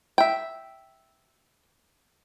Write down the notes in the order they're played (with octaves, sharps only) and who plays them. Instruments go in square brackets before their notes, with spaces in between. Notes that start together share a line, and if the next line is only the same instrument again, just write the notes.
[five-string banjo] E5 G5